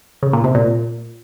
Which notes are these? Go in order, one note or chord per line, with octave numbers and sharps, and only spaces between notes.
C#3
A#2
C3
A#2